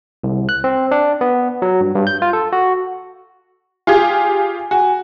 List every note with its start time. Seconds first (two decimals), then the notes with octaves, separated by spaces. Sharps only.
0.24 C2
0.49 F#6
0.64 C4
0.91 D4
1.21 B3
1.62 F#3
1.81 G2
1.95 G2
2.07 G6
2.22 F4
2.33 A4
2.53 F#4
3.87 F4 G4 G#4 G#5
4.71 F#4 G#5